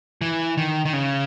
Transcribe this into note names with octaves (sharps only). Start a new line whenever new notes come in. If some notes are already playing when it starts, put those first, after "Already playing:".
E3
D#3
D#3
C#3